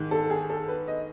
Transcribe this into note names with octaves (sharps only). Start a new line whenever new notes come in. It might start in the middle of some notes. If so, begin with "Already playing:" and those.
Already playing: G#2 D#3
A4
G#4
A4
B4
D#5